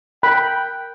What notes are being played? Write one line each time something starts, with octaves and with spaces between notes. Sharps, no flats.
A#4 G5 B5 F#6